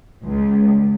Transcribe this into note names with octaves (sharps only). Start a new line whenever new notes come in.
C#2